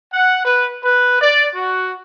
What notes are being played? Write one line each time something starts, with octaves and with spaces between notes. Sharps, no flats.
F#5
B4
B4
D5
F#4